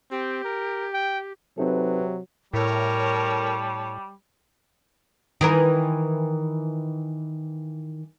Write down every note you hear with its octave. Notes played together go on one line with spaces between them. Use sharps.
C4 G4
A#4
G5
C3 F#3 C4 D#4 A4 B4
A2 G3 A#4 C#5 A5
D#3 E3 A#4